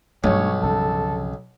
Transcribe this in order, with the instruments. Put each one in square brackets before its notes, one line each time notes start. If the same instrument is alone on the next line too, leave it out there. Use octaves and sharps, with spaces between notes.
[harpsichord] B1 [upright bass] G2 F3 [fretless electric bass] A3 D4 [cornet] C#5
[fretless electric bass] C2 C#3 [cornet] A4